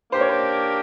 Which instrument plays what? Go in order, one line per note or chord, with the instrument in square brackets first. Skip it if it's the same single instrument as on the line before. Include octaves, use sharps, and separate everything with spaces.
[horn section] A#3 D4 G4 A#4 [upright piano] C5
[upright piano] C#5
C5